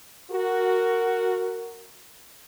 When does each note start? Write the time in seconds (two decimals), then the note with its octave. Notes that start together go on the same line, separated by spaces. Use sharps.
0.30 F#4 A#4